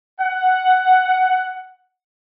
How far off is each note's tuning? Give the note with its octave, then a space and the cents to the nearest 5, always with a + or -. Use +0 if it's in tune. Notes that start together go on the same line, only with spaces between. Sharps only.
F#5 +10